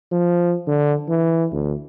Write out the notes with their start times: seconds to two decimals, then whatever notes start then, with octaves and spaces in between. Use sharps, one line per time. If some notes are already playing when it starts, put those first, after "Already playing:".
0.12 F3
0.68 D3
1.09 E3
1.52 D2